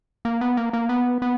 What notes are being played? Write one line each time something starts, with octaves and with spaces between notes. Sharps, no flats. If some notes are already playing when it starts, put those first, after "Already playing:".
A#3
B3
A#3
A#3
B3
B3